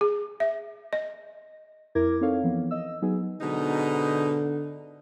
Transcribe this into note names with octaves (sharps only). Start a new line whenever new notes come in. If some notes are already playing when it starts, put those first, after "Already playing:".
G#4
E5
D#5
F2 E4 A#4 D6 G#6 A#6
C4 D#4 A4 C#5 F5
E3 F3 B3
D#5 E6
F#3 B3 D#4 G#4
G#2 B2 D3 D#4